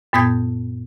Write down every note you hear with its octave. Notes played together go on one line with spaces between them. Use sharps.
F#2 A#2 B3 D#6 G6 G#6